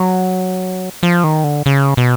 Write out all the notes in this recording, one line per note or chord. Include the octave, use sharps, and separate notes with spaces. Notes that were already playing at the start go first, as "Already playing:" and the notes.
Already playing: F#3
F3
D#3
D3
C#3
B2